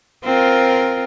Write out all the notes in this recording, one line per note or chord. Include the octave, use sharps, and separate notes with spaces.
C4 F4 A#4